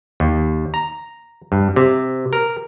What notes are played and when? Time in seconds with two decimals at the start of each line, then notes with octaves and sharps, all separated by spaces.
0.20 D#2
0.74 A#5
1.52 G2
1.76 C3
2.33 A#4